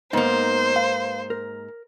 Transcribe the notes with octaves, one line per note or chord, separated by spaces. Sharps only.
G#2 A#3 B3 D#4 C5
B4 F5
A#4